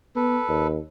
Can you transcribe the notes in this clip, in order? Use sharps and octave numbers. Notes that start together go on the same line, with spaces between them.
B3 A4 B4
D#2